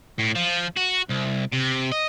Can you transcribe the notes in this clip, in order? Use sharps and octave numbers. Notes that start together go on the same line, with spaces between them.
A2
F3
F#4
C2
C3
D#5